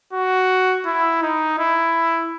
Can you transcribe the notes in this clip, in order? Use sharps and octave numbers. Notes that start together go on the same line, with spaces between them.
F#4
E4
D#4
E4